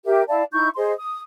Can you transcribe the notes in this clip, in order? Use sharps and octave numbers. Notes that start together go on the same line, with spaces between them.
G4 A#4 E5
E4 D5 F5 A5
D#4 E4 C#6 G6
G#4 C5 D#5 C6
D#6